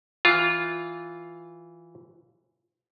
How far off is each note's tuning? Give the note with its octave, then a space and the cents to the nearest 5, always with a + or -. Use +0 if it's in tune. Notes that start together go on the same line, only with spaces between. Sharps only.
E3 +0 F4 +0